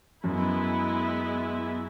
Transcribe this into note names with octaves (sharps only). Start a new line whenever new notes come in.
F#2 G#3 B3 E4